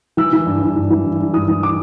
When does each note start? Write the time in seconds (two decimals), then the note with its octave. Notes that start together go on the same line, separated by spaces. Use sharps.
0.17 E3 E6
0.33 E3
0.46 G2
0.62 G2
0.76 E3
0.91 E3
1.05 G2
1.20 G2
1.34 E3 D#6
1.48 E3
1.63 D6